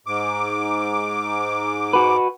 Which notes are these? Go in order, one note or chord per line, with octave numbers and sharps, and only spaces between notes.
G#2 D6
F#4 B4